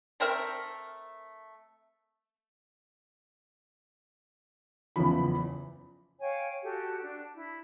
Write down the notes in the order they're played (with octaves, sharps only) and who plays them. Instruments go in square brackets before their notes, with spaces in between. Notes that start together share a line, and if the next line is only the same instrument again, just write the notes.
[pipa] A3 C4 A#4 E5
[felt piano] F#1 E2 C#3 E3 F3 B5
[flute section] C#5 F5 G5 G#5
F#4 G4 A4
D4
E4